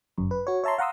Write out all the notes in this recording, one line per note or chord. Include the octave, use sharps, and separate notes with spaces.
G1 F#2
B4
F#4 C#5
C#5 E5 A5 A#5 C6
F5 F#5 A#5 C6 D#6 E6